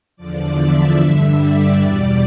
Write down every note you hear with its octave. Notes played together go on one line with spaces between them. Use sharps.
E2 D3 F3 D5
E5
G2 D3 G3 E5
D5
E2 B2 G3